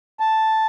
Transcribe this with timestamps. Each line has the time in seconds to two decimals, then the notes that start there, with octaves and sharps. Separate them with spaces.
0.20 A5